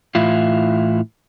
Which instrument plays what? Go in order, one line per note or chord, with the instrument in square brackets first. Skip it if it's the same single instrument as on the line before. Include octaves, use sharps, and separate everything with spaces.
[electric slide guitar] A2 E3 E4 F4